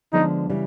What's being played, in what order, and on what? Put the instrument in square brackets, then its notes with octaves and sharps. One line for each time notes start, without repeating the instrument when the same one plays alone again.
[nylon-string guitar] D3 F3 G#3 B3 [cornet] D#4
[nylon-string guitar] C#3 E3 G3